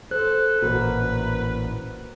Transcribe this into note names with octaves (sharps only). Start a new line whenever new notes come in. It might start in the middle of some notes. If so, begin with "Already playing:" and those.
A4 C5 F#6
A1 A#2 F#4 A#4 B4